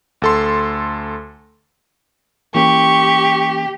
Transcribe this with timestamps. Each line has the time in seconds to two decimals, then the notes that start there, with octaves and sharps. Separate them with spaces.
0.22 D2 A4 C6
2.55 E3 A#3 C#4 G4 C#6